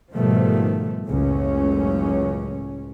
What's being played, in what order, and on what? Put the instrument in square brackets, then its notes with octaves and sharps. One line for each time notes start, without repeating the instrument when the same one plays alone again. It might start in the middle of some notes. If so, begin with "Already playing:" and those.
[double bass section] G#2 B2 D#3 F3 G3 A3
F#1 C#2 A2 C#4